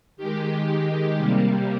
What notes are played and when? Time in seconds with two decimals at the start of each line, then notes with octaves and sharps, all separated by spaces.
0.17 D#3 G#3 G4
1.17 C3 G3 A#3